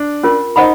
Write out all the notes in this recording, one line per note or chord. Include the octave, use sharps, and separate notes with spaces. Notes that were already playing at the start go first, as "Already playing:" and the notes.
Already playing: D4
C#4 F4 A#4
D#4 C5 D#5 F#5 B5